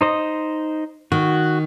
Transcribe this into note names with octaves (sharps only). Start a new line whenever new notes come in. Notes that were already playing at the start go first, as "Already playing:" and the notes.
D#4 C5 D#5
D#3 F#4